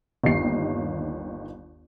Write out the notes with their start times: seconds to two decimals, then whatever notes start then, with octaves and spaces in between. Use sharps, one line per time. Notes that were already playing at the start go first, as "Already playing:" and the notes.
0.24 G1 D#2 D#3 G4 D#5 C7